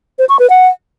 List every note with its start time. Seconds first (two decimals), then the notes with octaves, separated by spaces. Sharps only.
0.19 C5
0.29 C#6
0.39 B4
0.50 F#5